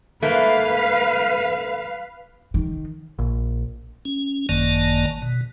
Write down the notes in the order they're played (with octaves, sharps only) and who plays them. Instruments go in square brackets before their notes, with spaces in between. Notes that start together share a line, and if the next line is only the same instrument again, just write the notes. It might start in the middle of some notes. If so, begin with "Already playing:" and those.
[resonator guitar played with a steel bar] G#2 A3 A#3 [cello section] B4 F5
[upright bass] D#3
[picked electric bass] A#1
[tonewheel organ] C#4
G#1 F#2 D#3 A#3 D5 A5
B2